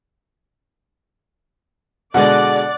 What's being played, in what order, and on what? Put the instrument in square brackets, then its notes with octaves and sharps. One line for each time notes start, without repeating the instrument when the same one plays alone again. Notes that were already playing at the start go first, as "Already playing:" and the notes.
[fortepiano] B2 D3 G#3 [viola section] D5 [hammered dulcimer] F#5